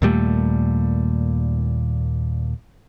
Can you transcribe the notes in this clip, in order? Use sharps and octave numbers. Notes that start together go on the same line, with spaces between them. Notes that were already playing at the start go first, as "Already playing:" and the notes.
D#2 A#2 G3 A3